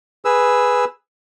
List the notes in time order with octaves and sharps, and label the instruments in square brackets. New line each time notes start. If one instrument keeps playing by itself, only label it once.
[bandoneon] G#4 B4 E6